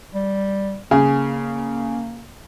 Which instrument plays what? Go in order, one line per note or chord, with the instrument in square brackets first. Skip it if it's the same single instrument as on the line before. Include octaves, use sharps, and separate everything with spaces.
[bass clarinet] G3
[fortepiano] C#3 G#4 [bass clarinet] A#3